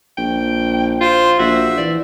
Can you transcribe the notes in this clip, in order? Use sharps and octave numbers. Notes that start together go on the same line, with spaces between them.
A#1 G5
F4 C5
A#1 F#4 E5
E3 D5